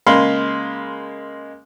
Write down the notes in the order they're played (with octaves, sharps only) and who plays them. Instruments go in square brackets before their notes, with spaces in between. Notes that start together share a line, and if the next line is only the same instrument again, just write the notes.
[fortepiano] C#3 G#3 A#3 F5 B5 C6